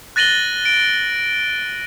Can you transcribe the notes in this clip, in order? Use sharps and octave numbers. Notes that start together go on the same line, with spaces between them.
F#6 A6 A#6 D#7 F#7 G7
D7